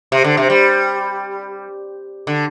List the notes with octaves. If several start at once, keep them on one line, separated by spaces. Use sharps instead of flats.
C3
D3
C3
G3
D3